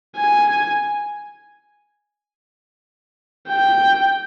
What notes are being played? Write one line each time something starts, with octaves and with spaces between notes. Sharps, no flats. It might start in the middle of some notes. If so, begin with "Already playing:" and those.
G#5
G5